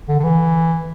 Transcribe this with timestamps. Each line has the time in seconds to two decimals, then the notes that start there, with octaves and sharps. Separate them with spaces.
0.09 D3
0.20 D3
0.24 E3